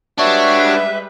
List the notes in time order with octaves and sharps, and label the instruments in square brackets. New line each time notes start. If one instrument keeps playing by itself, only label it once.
[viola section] G3 G#3 B4 [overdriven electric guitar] D4 [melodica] F#4 C#5 [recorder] E5